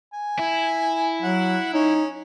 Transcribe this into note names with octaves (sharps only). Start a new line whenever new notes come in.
G#5
E4
F#3 F#5
C#4 D#4